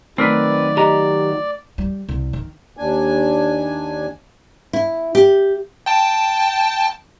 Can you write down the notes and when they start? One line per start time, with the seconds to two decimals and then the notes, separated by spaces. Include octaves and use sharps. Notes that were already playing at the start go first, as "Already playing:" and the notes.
0.18 D#3 F#3 A3 C4 A#4 B4 D5
0.77 G4 D#5 A#5
1.78 G3
2.09 C2
2.33 D#3
2.77 D#2 D4 G#5
4.73 E4
5.15 G4
5.86 G5 A5